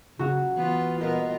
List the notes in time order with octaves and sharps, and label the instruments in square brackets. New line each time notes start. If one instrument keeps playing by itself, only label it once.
[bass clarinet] C#3 [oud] F#3 [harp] F#4
[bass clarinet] E3 [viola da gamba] B3 F4
[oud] A#2 G3 D#5 [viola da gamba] B3 F4 A#4